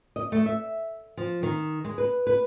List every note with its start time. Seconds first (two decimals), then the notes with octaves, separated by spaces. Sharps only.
0.16 D#5
0.32 A3
0.46 E5
1.17 F3
1.43 D#3
1.85 G#3
1.98 B4
2.27 B4